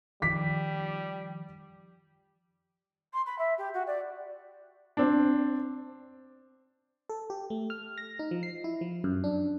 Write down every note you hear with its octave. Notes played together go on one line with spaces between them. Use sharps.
D#3 F3 G3 D6 B6
C6
B5
E5
G4
F#4
D5
C4 D4
A4
G4
A3
F6
A#6
D#4
F3
C7
E4
F3
F#2
D4